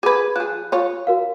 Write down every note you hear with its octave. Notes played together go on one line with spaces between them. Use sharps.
G#4 B4 D6 G#6
F3 G#4 F#6
F4 C#5
F#4 A#4 F5